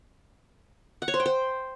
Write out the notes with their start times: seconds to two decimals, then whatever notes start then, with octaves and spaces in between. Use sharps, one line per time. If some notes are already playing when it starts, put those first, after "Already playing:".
1.02 F#5
1.08 C#5
1.14 C5
1.20 G5
1.26 C5